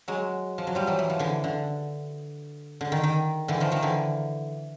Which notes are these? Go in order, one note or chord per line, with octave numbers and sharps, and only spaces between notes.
F#3 G#3
F3
F#3
F3 G3
E3 F#3
E3
F3
D3 E3
D3
D3
D#3
D#3
D3 E3
D#3 F3
D#3 F3
D3 E3